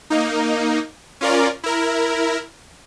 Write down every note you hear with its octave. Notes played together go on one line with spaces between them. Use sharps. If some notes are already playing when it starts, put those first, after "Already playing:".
A#3 D#4
C#4 F4 A#4 D5
E4 A#4